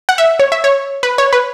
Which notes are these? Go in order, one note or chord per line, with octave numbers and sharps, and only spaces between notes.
F#5
E5
C#5
E5
C#5
B4
C#5
B4